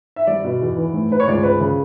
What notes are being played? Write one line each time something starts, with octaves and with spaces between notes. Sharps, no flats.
E5
G3 D5
B2
E2
E3
A2
A2 B4
C#5
C#2 D5
C#2 B4
C#3